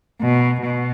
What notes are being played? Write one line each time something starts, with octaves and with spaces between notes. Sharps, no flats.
B2
B2